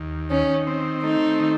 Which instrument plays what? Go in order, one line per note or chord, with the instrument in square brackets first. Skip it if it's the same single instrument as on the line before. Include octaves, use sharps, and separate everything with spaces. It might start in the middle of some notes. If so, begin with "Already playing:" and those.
Already playing: [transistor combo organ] D#2
[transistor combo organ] D#3 [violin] C#4
[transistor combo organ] C4
[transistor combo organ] A3 [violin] D#4
[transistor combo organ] D#3